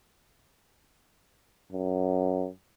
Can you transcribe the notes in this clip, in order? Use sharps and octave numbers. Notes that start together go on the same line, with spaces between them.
F#2